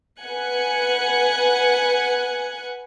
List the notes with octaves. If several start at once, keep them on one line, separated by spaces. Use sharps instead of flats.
B4 F#5 G#5 F#6 C#7